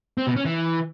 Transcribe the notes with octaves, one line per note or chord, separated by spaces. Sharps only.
C4
B2
C#4
E3